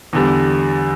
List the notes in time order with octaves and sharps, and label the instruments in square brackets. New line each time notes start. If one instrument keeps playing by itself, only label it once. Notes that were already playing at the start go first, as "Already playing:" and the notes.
[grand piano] E2 D3 G3